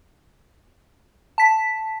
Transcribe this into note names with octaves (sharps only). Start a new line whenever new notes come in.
A5 B6